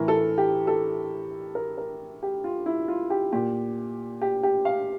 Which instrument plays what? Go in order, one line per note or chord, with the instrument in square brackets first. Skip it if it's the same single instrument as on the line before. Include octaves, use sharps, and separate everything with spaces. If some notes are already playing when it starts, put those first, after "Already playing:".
Already playing: [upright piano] A2 E3 A#4
A4
G4
A4
A#4
A#4
G4
F4
E4
F4
G4
A#2 G4
G4
G4
F5